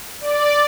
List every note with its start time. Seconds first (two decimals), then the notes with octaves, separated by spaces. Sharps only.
0.21 D5